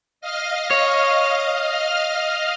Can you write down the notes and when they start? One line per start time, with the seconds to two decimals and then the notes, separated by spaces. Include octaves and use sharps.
0.21 D#5 F5 F6
0.71 C#5